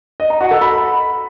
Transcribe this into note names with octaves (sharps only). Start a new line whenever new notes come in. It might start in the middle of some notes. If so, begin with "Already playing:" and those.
D#5
A#5
F#4
A4
B5